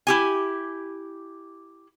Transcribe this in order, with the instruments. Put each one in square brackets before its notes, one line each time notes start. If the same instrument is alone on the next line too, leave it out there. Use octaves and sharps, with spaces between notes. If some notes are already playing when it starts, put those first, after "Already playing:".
[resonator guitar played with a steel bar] E4 G4 G#5